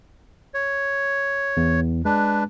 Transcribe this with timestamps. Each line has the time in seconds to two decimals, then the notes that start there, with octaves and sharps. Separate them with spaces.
0.54 C#5
1.57 E2
2.05 G#3 D4 B4